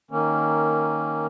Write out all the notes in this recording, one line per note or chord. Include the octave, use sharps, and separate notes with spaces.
D#3 A#3 C#4